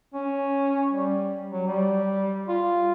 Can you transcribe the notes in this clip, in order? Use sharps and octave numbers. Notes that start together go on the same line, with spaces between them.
C#4
G3
F#3
G3
F4